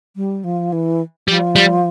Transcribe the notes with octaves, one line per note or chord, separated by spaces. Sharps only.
G3
F3
E3
F3 G3
G3